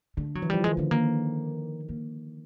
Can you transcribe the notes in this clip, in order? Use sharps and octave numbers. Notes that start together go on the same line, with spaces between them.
D3 A3
F#3
E3
F3 G3
D#3 G#3
D3 A3
D#3 A#3
A#3